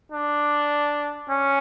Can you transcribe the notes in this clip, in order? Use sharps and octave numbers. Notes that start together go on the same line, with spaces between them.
D4
C#4